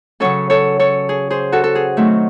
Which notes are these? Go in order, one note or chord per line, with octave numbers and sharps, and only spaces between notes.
C#3 F#3 C#4 A4 C#5
A4 C#5
A4 C#5
G#4
G#4 C5
F#4 A4
A4
G#4
D#3 F#3 A3 C4